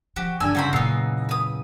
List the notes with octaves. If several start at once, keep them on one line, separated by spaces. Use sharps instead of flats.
F3 F#4 G4
G2 D3 G3 G#5 E6
E2 C#3 F#4 C5 A#5 B5
F#2 A#2 B3 D#4 E6 C7
B4 D#6